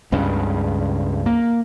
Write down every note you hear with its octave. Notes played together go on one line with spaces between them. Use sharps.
C#2 G2 C#3
A#3